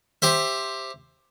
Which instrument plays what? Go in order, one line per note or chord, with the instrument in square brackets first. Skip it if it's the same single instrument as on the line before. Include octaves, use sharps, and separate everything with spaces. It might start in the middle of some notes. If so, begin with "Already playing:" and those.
[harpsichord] G4 C5 E5